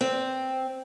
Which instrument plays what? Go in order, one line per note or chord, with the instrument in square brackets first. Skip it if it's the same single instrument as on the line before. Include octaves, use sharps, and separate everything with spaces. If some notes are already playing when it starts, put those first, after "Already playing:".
[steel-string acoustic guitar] C4